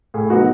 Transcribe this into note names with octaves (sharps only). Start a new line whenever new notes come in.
A2 G#4
F#3 B3 D#4 F#4